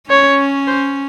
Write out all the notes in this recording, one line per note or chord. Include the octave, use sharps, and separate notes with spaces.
C#4 C#5
C5